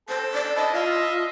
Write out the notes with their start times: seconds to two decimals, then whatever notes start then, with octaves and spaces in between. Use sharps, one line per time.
0.09 A4 C5
0.34 D5
0.56 E4 D#5 A5
0.74 F4 E5 F5